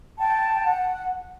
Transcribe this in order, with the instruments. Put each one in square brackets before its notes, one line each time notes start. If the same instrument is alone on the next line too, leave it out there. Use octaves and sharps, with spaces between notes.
[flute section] G5 A5
G5
F#5